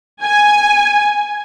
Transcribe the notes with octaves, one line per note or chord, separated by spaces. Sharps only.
G#5